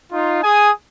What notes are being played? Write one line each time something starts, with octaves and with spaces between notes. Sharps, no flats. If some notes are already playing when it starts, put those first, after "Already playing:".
D#4 F4
G#4 G#5 D#6